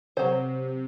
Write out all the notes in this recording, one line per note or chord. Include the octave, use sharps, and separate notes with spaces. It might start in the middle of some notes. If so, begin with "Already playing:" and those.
C3 F#3 C5